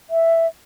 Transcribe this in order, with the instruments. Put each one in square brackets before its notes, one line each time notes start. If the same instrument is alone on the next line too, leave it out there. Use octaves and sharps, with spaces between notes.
[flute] E5